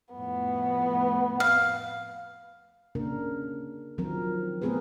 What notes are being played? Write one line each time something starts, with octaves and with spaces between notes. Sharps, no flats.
F2 A2 B3
F5
C#3 A#3 D4 A#4
D#3 F3 F#3 C4 A#4
A3 B3 C4 G#4 A#4 B4